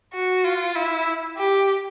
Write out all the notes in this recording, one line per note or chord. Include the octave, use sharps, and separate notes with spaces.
F#4
F4
E4
G4